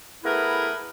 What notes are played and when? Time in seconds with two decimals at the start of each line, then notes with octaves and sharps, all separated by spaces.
0.24 A3 B3 E4 G#4 A#4 B4